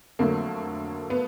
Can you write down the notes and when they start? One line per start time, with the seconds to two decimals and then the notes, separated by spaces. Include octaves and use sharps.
0.19 F2 D3 F#3 A3 A#3
1.10 B3